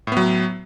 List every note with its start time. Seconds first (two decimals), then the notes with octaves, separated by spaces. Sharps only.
0.07 A2
0.12 B3
0.17 F#3